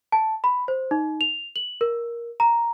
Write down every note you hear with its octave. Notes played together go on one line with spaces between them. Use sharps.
A5
B5
C5
D#4
F7
F#7
A#4
A#5